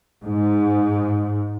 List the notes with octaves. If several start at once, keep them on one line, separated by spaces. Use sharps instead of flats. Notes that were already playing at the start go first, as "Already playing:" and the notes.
G#2